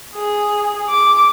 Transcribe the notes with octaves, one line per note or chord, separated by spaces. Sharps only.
G#4
D6